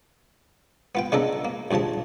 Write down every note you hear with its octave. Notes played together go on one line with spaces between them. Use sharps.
B3 F4 G5
C#3 G#3 D4 F4 A4 A#4
A#3
A#1 D#2 C#3 F3 A5